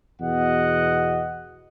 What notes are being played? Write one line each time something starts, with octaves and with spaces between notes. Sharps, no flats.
E2 B2 D#5 F#5